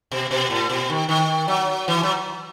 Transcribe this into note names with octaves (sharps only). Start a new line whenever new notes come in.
B2
B2
A2
B2
D#3
D#3
F#3
E3
F#3